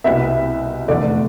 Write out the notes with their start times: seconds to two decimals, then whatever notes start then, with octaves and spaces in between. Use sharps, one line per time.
0.04 C2 B2 B3 E5
0.88 F1 E2 D3 A3 D5